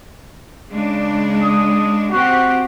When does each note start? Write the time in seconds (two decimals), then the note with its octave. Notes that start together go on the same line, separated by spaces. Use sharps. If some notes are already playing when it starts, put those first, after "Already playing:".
0.70 C#3 G#3 D4
1.43 D#6
2.12 C4 F#4 G4